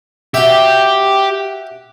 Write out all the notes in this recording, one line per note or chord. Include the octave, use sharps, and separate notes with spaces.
F#4 G4 E5